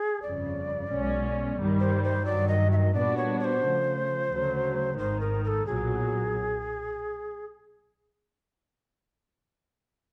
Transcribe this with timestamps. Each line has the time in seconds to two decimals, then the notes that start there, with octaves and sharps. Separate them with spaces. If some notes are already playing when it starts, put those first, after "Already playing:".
Already playing: G#4
0.22 G1 F2 C#3 D5
0.90 B1 B2 G#3 C#4
1.58 G2 D#3 G3
1.80 C5
2.04 C5
2.25 G2 D#3 F#3 D5
2.48 D#5
2.72 E5
2.76 D#5
2.94 A#2 G3 B3 D4 F#4 D5
3.17 C#5
3.39 C#5
3.44 C5
3.62 C#3 F3 A3
4.30 D2 C#3 F#3 A3
4.98 G#1 G#2 D#3 C5
5.21 A#4
5.44 A#4
5.47 A4
5.66 B1 A#2 F#3 G#4